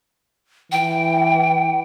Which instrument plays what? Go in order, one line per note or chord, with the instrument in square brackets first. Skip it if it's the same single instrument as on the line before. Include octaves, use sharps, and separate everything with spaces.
[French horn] E3 [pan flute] G5